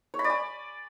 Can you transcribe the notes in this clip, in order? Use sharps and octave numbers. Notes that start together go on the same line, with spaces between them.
C#5
B5
D5
G#5